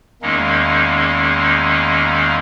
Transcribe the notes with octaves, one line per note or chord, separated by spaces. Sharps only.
E2 D#3 G#3 A#3 C#4 D#4